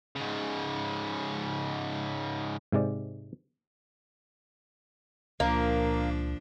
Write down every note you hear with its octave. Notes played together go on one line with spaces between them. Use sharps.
G#2 C#3
G#2 C3 G#3 D5
C#2 A#2 F3 A#3 D4